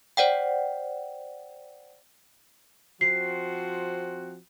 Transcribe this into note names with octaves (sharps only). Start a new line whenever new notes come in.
C5 D5 F#5 G5
F3 C4 F#4 C7